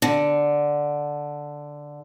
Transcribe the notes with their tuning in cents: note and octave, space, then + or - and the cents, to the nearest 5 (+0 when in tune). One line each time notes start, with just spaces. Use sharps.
D3 +0